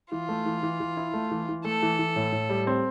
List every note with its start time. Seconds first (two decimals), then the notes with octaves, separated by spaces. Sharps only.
0.12 E3 F4
0.29 A3
0.46 E3
0.63 E3
0.80 E3
0.97 E4
1.14 A3
1.31 E3
1.49 E3
1.64 A3 A4
1.83 E3
1.99 E3
2.16 A2
2.32 A2
2.49 G3
2.67 C4